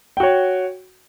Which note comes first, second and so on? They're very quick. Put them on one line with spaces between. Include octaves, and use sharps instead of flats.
G5 F#4 C#5